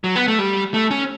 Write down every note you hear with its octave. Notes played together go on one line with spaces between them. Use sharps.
F#3
B3
A3
G3
A3
C#4